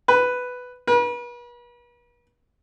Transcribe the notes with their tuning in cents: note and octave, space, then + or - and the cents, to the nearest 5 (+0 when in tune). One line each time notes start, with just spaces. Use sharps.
B4 +5
B4 -40